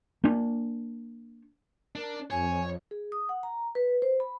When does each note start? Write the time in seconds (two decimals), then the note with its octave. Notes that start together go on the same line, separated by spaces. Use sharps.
0.24 A#3 D4
1.95 D4 A#4
2.30 F2 C#5 G#5
2.91 G#4
3.12 D#6
3.29 F#5
3.43 A#5
3.75 B4
4.02 C5
4.20 B5